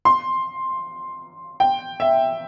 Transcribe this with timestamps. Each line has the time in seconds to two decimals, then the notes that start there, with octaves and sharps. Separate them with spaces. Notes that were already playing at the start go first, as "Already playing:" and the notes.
0.05 C6
1.60 G5
2.00 E5